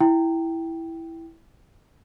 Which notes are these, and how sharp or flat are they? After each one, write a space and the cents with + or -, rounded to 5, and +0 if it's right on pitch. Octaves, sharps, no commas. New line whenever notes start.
E4 +0 G5 +0